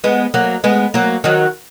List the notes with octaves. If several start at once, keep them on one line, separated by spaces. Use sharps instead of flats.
G#3 B3
F#3 A#3
G#3 B3
F#3 A#3
D#3 F#3